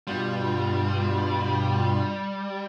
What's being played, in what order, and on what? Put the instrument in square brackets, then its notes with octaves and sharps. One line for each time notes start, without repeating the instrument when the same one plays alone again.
[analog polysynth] G2 B2 F4 [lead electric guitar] G3